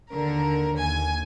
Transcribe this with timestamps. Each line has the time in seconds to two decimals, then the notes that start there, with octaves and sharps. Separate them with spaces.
0.14 D#2 D3 A#4
0.75 D#2 G#5